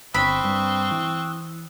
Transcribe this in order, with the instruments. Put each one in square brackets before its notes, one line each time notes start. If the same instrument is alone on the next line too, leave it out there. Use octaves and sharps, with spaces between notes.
[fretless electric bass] G1 [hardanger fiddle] C4 C#6 [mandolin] B5 [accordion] D#6 E6 F#6
[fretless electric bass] G2
E3